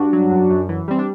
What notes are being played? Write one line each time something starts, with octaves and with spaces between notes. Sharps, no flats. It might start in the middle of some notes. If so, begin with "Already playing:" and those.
Already playing: G2 D4 F#4
F#3
F#2
F#2
E3
G3 C4
D4